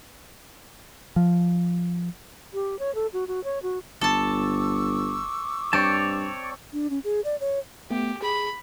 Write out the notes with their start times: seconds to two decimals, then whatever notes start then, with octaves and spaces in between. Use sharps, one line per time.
1.16 F3
2.54 G4
2.79 C#5
2.95 A4
3.13 F#4
3.28 F#4
3.44 C#5
3.63 F#4
4.01 G1 A4 A5 C#6 D6 E6
5.73 G2 C4 C#5 D5 A5
6.73 D4
6.90 C#4
7.04 G#4
7.24 D5
7.40 C#5
7.90 A3 B3 G4
8.22 G#4 B5